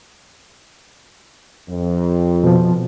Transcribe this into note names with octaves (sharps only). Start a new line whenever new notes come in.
F2
B2 F3